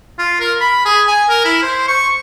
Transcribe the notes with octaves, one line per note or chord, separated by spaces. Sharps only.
F4
A#4
B5
G#4
G#5
A#4
E4
C5
C#6